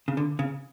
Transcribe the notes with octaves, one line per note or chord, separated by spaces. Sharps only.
C#3
D3
C#3